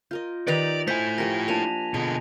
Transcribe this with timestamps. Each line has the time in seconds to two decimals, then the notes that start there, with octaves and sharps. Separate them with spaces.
0.11 F4 A#4 D#5 G6
0.47 D#3 D#4 G4 B4 D5 A#6 F7 F#7
0.87 A3 E4 C5 G#5 G#6 B6
1.18 F3 G4 A#4 A#6
1.48 F3 A#3 D4 A5 D#7 F7
1.94 B2 D3 G#4 D#5